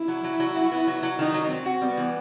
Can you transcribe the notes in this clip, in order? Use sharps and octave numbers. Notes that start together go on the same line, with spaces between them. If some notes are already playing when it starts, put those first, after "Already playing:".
Already playing: E4
F#3
F#3
F#3
F#4
B3
F#3
F#3
D#3 D#4
F#3
F#3 C4
F#4
G3 B3
E3